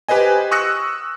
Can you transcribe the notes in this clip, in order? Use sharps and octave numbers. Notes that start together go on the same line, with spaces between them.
G4 B4 C5 D#5 G#5
C#6 D#6 E6 F#6 A#6 C#7